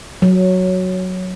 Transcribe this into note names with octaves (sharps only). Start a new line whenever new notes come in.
F#3